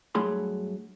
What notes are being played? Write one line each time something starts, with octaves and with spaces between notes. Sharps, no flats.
G2 F#3 A3 G#4 B5 C6